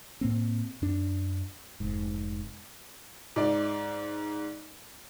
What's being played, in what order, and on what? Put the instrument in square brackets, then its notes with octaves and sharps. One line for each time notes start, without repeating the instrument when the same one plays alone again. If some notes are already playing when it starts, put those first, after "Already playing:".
[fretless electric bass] A2 A#3 C4
F#2 D4
F1 G#2
[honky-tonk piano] G#2 D5